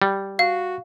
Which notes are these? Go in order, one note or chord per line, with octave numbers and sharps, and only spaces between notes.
G3
F#4 F5